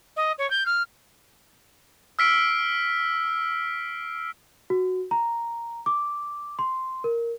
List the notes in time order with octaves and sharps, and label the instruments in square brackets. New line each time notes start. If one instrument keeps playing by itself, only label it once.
[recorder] D#5
C#5
G6
F6
[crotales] E6 F6 B6 C7 D7
[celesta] F#4
A#5
D6
C6
A#4